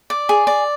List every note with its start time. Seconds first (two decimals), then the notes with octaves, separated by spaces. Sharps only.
0.10 D5
0.29 G#4
0.47 D5